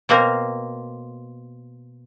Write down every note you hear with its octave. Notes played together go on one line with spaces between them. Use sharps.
B2 A#3 C4 A#4